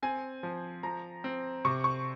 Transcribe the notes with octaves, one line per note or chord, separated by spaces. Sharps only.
C4 G#5
F3
F3 A#5
C4
C3 C#6
C#6